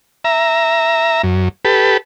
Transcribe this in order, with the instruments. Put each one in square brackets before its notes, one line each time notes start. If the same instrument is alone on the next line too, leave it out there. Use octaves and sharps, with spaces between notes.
[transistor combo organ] E5 A#5
F#2
G4 A4 B4